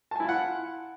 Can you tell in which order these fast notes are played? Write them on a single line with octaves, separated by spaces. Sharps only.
A5 G#5 E4 F4 F#5